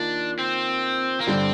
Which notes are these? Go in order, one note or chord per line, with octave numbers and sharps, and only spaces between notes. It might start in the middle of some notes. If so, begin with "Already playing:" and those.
Already playing: D#3 A#3 D4 F4
C4
A#3
G2 D3 G3 C4 D4